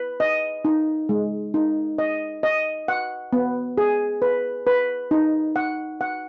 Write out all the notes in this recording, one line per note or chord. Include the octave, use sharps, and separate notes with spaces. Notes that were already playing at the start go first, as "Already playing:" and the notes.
Already playing: B4
D#5
D#4
G#3
D#4
D#5
D#5
F#5
B3
G#4
B4
B4
D#4
F#5
F#5